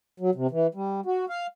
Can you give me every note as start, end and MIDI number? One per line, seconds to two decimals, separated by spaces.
0.20 0.30 54
0.35 0.47 48
0.51 0.67 52
0.75 1.01 55
1.06 1.25 66
1.30 1.47 77